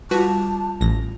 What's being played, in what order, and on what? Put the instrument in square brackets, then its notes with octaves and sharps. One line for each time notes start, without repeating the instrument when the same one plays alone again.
[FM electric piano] G3 F4 [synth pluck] F#4 B4 [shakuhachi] A5
[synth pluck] A1 A#6